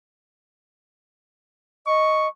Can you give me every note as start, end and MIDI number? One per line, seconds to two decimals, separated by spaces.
1.87 2.28 75
1.87 2.28 85